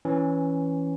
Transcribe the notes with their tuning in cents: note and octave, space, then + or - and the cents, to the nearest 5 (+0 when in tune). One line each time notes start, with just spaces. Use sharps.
E3 +0 C#4 +0